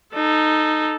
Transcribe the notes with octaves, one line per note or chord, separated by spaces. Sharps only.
D#4 A4